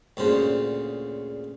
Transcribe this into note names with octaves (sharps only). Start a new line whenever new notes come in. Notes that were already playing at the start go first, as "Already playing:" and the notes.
D2 A#2 C#3 C5